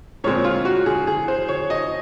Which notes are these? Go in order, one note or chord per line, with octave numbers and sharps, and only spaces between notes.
A#2 G#3 C4 C#5
F4
F#4
G#4
G#4
C5
C#5
D#5